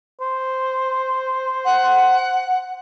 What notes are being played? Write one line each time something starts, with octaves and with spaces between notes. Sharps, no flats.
C5
F#5